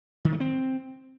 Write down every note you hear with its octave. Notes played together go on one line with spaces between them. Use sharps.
D#3
A3
C4